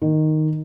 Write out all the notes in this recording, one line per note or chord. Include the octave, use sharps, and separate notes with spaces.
D#3